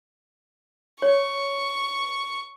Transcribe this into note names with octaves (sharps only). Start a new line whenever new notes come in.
C#5 C#6